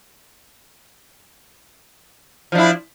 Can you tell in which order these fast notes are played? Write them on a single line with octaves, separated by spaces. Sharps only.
F3 D4 E4